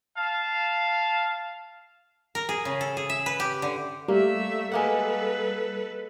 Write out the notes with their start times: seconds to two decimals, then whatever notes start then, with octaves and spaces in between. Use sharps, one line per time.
0.17 F5 A5
2.35 A#4
2.49 G#4
2.65 C#3
2.81 A4
2.97 G#4
3.10 E5
3.26 B4
3.40 G4
3.62 D3
4.08 G3 A3 A#3 E5
4.72 G#3 A#3 A4 B4 F#5